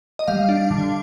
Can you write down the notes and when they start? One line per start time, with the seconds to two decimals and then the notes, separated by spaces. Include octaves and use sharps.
0.19 D#5
0.27 G3 F5
0.49 D4
0.71 D3